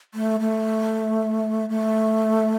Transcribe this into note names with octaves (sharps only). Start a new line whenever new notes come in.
A3
A3
A3